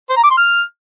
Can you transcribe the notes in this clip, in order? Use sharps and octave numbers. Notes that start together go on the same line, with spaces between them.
C5
A#5
D6
C6
F6